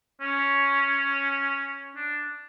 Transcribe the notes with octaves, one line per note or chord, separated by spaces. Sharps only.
C#4
D4